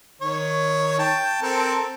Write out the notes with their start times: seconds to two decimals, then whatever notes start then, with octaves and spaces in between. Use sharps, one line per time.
0.21 D#3 C#5
0.99 G5 A5
1.42 C4 A4 A#4